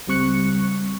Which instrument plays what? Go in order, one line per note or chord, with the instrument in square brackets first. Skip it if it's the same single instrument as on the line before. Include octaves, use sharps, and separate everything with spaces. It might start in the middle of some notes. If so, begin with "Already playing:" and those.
[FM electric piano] C#2 G3 C4 C#6 F#6 C#7